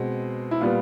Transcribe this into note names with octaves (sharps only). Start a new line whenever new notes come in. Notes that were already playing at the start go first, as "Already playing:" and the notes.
Already playing: B2 G#3 C4
E4
A#2 G3 B3 F4